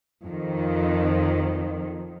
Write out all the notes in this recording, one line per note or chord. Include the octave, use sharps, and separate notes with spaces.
F2 D#3